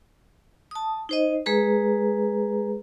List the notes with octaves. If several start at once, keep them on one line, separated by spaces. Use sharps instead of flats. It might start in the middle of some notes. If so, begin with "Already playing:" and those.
A5 D#6
D#4 C5 D#5
G#3 G#4 B4 A#5